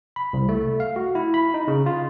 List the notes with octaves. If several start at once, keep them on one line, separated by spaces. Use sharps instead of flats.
B5
C2
A3
F5
F#4
E4
B5
D#4
C#3
F4